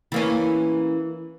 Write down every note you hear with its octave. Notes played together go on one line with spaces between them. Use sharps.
E3 A#3 C#4